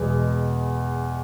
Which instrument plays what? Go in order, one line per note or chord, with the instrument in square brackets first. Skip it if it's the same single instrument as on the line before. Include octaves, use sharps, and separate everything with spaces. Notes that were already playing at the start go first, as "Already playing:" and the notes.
Already playing: [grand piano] E2 B2 G#3 B3